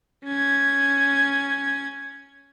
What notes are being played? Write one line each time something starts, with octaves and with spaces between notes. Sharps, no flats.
C#4 G#6